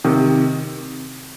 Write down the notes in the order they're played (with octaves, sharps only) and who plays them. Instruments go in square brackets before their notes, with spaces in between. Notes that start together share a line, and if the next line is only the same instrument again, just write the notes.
[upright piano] C3 D#3